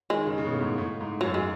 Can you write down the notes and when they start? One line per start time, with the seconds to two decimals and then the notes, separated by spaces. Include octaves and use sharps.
0.10 D#3 G#3
0.26 C#3
0.38 C#3
0.45 B2
0.53 A2
0.61 G#2
0.78 A2
1.01 G#2
1.21 F#2 F#3
1.34 G#3